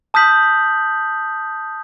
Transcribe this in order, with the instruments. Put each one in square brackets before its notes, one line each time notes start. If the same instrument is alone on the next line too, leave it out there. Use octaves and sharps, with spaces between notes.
[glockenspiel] A5 D#6 F6 G6 B6 F#7